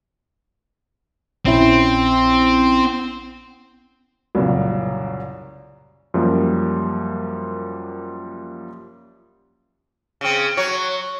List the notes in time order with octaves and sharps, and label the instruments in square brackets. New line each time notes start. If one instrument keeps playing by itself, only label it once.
[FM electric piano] A#1 C#4 E4 [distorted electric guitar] C4
[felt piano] C2 F#2 A#2 C#3 F#3
[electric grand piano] F#2 F3 G3 A#3
[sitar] C#3 C4
F#3 C#5